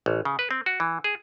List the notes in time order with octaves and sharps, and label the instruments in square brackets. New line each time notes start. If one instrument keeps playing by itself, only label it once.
[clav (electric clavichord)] A1
C#3
B4
C4
F#4
E3
G#4